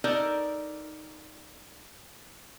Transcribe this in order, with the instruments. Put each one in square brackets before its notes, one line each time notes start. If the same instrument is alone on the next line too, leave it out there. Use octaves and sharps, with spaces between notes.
[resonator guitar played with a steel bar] D#4 A4 A#4 D5